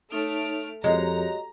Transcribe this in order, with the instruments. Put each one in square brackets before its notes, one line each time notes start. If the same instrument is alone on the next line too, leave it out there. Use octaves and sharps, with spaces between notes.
[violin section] A3 F6 D7 [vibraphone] D#4 A4 C#5
[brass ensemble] F2 [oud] G#3 [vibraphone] F#4 G4 C#5 [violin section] A#5